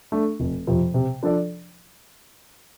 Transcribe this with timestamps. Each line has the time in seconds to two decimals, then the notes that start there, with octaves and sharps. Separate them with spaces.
0.12 A3 D4
0.40 F1
0.67 F2 C3 F3
0.94 C3
1.23 F3 D4 A4 D5